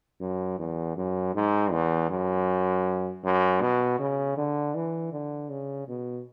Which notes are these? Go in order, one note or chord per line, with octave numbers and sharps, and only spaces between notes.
F#2
E2
F#2
G#2
E2
F#2
F#2
B2
C#3
D3
E3
D3
C#3
B2